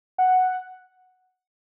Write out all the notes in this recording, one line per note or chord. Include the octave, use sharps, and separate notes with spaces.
F#5